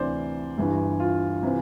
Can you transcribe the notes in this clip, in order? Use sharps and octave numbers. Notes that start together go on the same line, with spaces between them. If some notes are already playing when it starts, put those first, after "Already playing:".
Already playing: D2 C3 E3 C5 D5
G1 G2 E3
F4
C3 E3